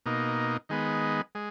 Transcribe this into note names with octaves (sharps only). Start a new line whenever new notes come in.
B2 A#3 D#4
D#3 G#3 B3
G#3